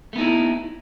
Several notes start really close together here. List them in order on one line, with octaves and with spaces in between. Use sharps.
A3 B3 D#4 E4